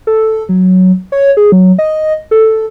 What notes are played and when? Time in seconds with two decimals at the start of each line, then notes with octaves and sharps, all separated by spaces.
0.07 A4
0.49 F#3
1.12 C#5
1.37 G#4
1.52 F#3
1.79 D#5
2.31 A4